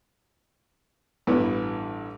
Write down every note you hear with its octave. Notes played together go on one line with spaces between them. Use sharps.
A1 G2 E3 B3